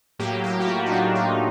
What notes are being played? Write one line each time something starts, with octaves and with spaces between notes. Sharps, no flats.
A2 F#3 A#3 G4
G4
F#4
F4
D#4
D4
D#4